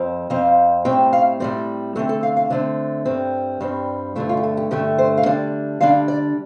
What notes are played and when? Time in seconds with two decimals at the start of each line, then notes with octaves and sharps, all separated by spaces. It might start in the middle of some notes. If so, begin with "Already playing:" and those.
Already playing: F2 F3 C4
0.30 F2 F3 C4 F5
0.85 A2 G3 C4 G5
1.13 F5
1.40 A2 G3 C4 D5
1.95 D3 A3 C4 A4
2.09 A4
2.23 F5
2.37 F5
2.50 D3 A3 C4 D5
3.06 G2 G3 C4
3.61 G2 G3 C4
4.16 G2 D3 A3 F4
4.29 F4
4.37 G4
4.43 A4
4.57 G4
4.71 G2 D3 A3 G4
4.98 C5
5.17 F5
5.26 D3 G3 D4 D5
5.81 D3 G3 D4 F5
6.08 D5